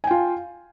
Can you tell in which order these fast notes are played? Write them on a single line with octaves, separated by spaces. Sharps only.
G#5 G5 F4